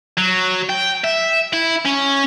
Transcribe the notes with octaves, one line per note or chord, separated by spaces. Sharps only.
F#3
G5
E5
E4
C#4